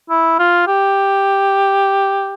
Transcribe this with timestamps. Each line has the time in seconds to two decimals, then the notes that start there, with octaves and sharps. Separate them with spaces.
0.10 E4
0.39 F4
0.67 G4